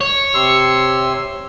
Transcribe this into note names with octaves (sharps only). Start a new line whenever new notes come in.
C#5
C3 C6 E6